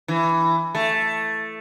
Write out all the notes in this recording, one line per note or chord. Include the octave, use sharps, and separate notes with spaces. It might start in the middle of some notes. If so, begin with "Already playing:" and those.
E3
A3